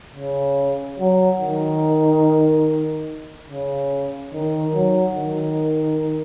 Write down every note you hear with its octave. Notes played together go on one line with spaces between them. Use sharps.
C#3
F#3
D#3
C#3
D#3
F#3
D#3